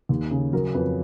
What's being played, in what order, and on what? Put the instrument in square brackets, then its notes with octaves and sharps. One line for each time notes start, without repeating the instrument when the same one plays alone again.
[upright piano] D#2
C#3
F#3 A#4
F2 B4